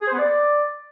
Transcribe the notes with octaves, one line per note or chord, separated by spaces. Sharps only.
G#4
C5
B3
D5